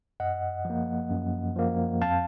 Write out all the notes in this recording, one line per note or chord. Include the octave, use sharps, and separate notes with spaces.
F#2 D#5 F#5
F3 A#3
F#2
F3 A#3
F2 F5 A5